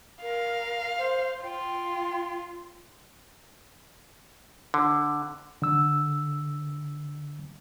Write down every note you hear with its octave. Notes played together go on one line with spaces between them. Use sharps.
A#4 F5
C5
F4 G5
D3
D3 E6